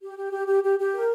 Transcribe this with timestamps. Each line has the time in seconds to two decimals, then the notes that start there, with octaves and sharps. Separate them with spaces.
0.01 G4
0.17 G4
0.32 G4
0.47 G4
0.63 G4
0.79 G4
0.94 A#4